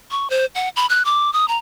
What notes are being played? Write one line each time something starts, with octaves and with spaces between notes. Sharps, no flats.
C#6
C5
F#5
B5
F#6
D6
D#6
A#5